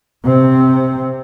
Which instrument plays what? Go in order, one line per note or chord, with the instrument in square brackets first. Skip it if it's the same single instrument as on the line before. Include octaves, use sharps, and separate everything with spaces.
[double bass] C3 C4